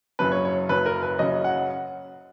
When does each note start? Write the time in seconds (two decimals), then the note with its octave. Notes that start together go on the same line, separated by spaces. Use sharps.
0.19 F#1 F#2 C#3 F#3 C#4 B4
0.32 C#5
0.45 C#5
0.69 F#1 F#2 C#3 F#3 C#4 B4
0.86 A#4
1.03 B4
1.18 F#1 F#2 C#3 F#3 C#4 D#5
1.44 F#5